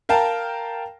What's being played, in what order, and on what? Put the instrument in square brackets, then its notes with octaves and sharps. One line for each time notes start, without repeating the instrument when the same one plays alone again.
[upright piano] A#4 F5 G5 A5 A#5